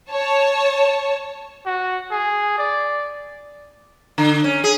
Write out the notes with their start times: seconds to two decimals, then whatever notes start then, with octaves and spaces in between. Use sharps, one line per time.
0.10 C#5 A5
1.66 F#4
2.11 G#4
2.58 D5
4.18 D3
4.44 C#4
4.64 G#4